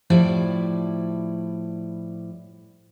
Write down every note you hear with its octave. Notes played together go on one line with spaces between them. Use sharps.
A2 F3 G3 E4 D5